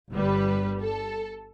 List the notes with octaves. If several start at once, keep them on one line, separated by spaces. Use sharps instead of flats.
G1 G3 B4
A4